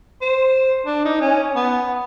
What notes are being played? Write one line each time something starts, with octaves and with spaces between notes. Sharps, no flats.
C5
D4
D#4
C#4
B3